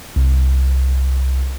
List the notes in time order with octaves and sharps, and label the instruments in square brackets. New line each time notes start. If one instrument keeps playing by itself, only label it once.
[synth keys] C2